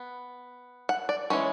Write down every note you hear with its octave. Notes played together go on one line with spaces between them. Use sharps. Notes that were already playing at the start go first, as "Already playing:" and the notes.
Already playing: B3
F#5
D5
E3 G#3 C#4 C#5